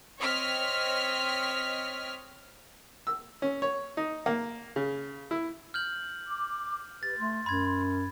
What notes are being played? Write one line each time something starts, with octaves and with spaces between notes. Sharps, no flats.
C4 C#5 D#5 F6 B6
E6
C#4
C#5
D#4
A#3
C#3
E4
F6 G6 F#7
D6
G4 B4 A6
A3 C6
F#2 B5 G#6